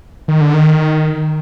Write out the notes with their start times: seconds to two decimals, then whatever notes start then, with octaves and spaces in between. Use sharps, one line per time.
0.28 D#3
0.41 D3
0.54 D#3